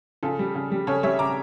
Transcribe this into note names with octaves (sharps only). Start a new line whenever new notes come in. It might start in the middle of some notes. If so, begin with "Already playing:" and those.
C#3 F4 A4
G3
C#3
G3
C#3 A4 C#5
G3 C#5 E5
C#3 A#5 D6